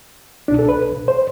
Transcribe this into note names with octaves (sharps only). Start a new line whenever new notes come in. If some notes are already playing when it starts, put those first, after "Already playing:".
C2 B2 D4
A4
B4
C5